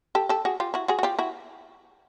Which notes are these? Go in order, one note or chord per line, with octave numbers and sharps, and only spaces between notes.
G4 A4
G4 A4
F#4 G#4
F4 G4
E4 F#4
F#4 G#4
F#4
F4 G4
E4 F#4